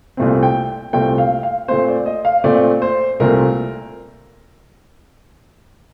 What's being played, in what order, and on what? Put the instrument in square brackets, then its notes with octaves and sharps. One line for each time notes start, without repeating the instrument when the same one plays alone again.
[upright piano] C2 A#2 A3 C4
G5
C2 A#2 A3 C4 G5
F5
F5
A#2 A3 C4 C5
D5
D#5
F5
A#2 A3 C4 D5
C5
C2 A#2 A3 C4 A#4